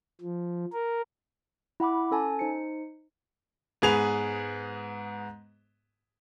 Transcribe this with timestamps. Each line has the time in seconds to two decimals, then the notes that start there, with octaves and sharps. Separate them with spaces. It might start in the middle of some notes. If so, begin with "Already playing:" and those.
0.22 F3
0.73 A#4
1.80 E4 F#5 B5 D6
2.11 C#4 A4 G#5 A5
2.39 D#4 C5 C#7
3.82 G#2 B3 G#4 B4 F7